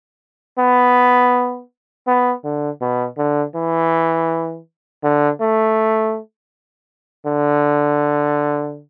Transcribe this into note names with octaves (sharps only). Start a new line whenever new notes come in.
B3
B3
D3
B2
D3
E3
D3
A3
D3